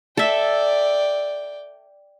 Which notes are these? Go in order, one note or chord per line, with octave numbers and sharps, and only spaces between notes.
A4 D5 E5 G5